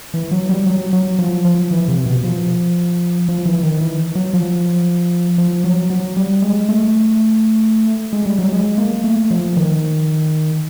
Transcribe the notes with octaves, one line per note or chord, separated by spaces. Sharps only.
E3
F#3
G3
F#3
F#3
F3
F3
E3
C3
B2
F3
F3
E3
D#3
E3
F#3
F3
F3
F#3
F#3
G3
G#3
A3
G#3
G3
F#3
G#3
A#3
A3
F3
D#3